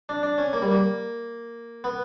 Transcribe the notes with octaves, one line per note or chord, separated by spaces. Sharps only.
D4
D4
C#4
A#3
G3
A#3
B3